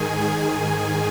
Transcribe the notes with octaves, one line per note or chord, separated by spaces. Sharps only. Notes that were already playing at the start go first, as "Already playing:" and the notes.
Already playing: G#2 D#3 G#4 G#5
G#4 G#5